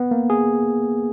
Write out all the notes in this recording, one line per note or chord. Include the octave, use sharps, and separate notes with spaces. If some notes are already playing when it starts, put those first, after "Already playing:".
Already playing: B3
A#3
G#4